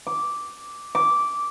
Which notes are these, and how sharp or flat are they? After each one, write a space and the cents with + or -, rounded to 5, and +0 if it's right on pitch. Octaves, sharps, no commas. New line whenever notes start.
D6 -5
D6 -10